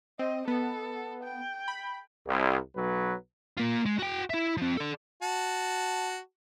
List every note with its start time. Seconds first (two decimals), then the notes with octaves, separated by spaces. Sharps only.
0.19 C4 D#5
0.48 B3 A4
1.24 G5
1.68 B5
2.26 C2
2.76 B1 F#3 B4
3.58 A#3 F4
3.86 G#3
3.99 F#4 G5
4.30 E4 E5
4.57 F3 C4
4.77 A4 D5
5.22 F#4 A5